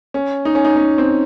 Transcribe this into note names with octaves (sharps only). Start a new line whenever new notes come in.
C#4
D#4
C#4
D#4
C#4
C4